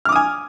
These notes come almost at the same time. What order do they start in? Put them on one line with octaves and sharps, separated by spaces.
F6 D6 D#6 G#5